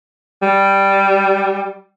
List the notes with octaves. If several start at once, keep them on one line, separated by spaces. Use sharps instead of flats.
G3